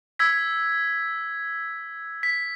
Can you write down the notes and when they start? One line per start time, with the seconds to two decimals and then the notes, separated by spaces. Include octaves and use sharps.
0.19 E6 G#6 B6
2.23 B6